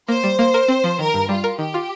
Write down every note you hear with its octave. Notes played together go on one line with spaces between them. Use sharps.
A#3 C5
G3
A#3
A#4
C4
F3
D#3 A#4
G2
G3 F4
A#4
D#3 G4
F4